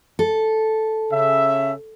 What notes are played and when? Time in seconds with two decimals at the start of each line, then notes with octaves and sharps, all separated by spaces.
0.19 A4
1.11 C#3 E5